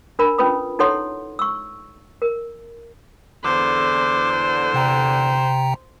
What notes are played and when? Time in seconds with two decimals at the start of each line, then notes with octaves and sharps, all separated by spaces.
0.19 D4 A#4 B5
0.38 C#4 F4 B4 B5 D#6
0.79 D#4 E4 A4 C#5 F#5 C6
1.39 C#6 E6
2.22 A#4
3.45 E2 D3 C5 D6
4.74 C3 G5 A#5